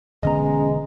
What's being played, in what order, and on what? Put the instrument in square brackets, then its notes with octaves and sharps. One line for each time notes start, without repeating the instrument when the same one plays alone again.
[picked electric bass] E1 D3 B3 [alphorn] G#3 [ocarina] C#4 [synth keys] D#5 A#5